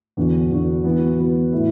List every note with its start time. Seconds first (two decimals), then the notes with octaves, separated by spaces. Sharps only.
0.17 E2 D3 B3 D4 F#4
0.50 E2 D3 B3 D4 F#4
0.84 E3 B3 F#4
1.18 E3 B3 F#4
1.53 A2 A3 E4